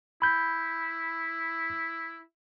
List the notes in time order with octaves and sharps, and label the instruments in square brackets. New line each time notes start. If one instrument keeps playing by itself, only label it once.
[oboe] E4 [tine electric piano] B5 G6